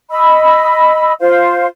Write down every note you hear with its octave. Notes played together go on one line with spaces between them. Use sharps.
D#5 B5 E6
F4 C5 F5